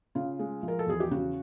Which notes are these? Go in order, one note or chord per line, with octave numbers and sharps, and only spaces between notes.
C#3 F4
G#3
F3
A#4
A4
E2 G#4
G4
C#3 F#4